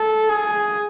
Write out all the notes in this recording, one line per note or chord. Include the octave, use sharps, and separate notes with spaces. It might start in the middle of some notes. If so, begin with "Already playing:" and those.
Already playing: A4
G#4